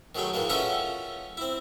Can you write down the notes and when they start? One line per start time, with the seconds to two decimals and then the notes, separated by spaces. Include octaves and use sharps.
0.15 D#3 F#3 G#3 A3 G5
0.34 A#2 D#3 E3 G#3 A#3
0.50 C#4 F4 A4 E5 F#5 G5
1.37 C4 E4